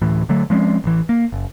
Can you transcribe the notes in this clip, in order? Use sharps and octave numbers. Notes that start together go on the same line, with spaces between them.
D1 A2 E3
D3 F#3 A3
F3 G#3 C4 C#4
A1 E3
A#3
F#1